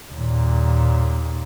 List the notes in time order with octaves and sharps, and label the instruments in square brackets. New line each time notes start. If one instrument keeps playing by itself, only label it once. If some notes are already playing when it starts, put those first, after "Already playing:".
[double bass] D#2 A#2